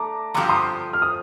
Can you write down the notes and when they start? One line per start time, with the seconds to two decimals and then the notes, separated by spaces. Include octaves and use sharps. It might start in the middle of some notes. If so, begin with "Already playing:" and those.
Already playing: A3 D4 A#5 D6
0.34 G2 D3 F3 C4 G4 A#5 D6
0.49 C6 D#6
0.93 F6
1.02 D#6